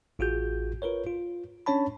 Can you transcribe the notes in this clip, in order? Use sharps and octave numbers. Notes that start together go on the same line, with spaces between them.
A1 F4 F#4 G#4 G6
F4 A#4 B4 C#5
F4
C#4 D4 C#5 A5 B5